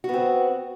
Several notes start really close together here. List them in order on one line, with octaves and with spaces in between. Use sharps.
F#4 B3 C4